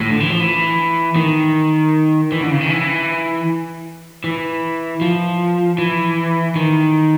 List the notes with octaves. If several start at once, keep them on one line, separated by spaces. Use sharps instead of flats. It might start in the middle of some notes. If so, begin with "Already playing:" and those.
A2
D3
E3
F3
E3
D#3
E3
D3
C#3
D#3
E3
E3
F3
E3
D#3